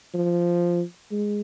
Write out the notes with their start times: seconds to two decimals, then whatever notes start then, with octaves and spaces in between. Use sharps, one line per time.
0.14 F3
1.12 G#3